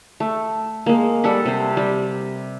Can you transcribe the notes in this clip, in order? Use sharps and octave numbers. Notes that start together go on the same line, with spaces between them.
A3
G#3 A#3
G3 A4 F#5 B5
C3 C5
G3